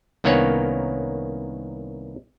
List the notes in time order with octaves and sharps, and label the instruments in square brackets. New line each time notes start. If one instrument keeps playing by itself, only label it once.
[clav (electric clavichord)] C2 D#3 A#3 B3 C#4 C#5